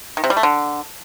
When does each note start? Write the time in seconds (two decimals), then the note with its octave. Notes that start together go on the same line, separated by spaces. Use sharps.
0.17 D#3
0.24 C3
0.30 G3
0.37 A3
0.43 D3